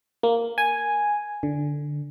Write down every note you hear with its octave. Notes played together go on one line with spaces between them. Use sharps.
A#3
G#5
D3